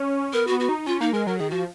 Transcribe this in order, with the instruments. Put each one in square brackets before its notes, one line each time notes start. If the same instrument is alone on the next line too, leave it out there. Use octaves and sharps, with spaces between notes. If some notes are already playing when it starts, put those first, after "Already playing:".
Already playing: [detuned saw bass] C#4
[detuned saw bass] B3 [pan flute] A#4
[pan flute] F#4
[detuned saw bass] B3
[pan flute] F#4
[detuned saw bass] D#4
[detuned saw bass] C#4 [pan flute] F4
[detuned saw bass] A#3 [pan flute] D#4
[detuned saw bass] G#3 [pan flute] A#4
[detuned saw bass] F#3 [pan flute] A#4
[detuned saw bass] D#3 [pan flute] G#4
[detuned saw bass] F3 [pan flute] F#4